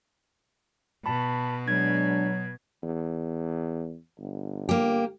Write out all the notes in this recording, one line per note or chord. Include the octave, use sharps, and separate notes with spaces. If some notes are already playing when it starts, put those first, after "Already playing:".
B2 A5 B5
F#3 G#3 D4 G#6
E2
G1
A#3 G4